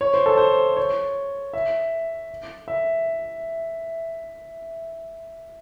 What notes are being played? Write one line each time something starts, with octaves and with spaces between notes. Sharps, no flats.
C#5
C5
A4
C5
C#5
E5
E5